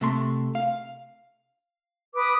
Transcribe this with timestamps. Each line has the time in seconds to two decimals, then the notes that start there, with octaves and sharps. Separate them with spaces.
0.01 C3 A3 C6
0.55 F5
2.14 B4 D6 D#6